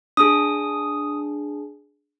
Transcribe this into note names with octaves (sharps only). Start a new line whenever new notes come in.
D4 G#4 D#6